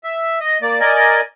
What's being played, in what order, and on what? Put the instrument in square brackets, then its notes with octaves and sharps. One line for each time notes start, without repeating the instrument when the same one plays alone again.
[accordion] E5
D#5
A#3 D5
A#4 D5 D#5 G#5